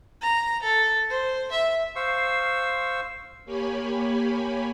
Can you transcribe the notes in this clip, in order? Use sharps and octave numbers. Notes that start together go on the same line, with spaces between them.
A#5
A4
C5
E5
C5 F5 C#6 E6
A#3 G4 C#5 G#5 B5